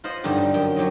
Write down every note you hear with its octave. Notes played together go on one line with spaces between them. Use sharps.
F4 B4 C5 D#5 F#5
G2 D3 G3 D#4 G4
F#2 G5
F#3 G4 C#5 D#5